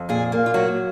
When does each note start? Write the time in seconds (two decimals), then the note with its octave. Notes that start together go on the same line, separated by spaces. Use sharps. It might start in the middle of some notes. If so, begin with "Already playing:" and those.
Already playing: F2
0.09 A#2 G#4
0.32 A#3
0.46 F4
0.54 F#3 F#4